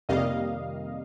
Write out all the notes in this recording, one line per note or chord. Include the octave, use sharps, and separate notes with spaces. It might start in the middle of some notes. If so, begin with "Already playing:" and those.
F2 C3 D#3 G3 A#3 D#5 F5